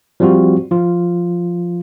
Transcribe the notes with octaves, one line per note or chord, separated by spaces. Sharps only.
F3 G3 C4 F4 F#4
F3 F4